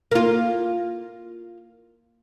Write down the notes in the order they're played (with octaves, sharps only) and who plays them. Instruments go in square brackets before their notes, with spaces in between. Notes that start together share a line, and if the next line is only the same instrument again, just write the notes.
[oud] A#3 F4